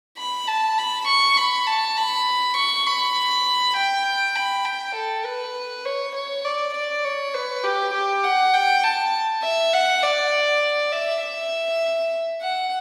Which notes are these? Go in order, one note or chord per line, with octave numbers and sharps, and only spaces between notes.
B5
A5
B5
C#6
B5
A5
B5
C#6
B5
G5
B5
G5
A4
B4
C#5
C#5
D5
D5
C#5
B4
G4
G4
F#5
G5
A5
E5
F#5
D5
E5
E5
F#5